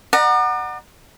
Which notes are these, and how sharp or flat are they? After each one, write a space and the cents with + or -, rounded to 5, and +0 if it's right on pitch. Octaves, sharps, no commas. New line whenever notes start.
D5 +45 F#5 +0 A#5 +15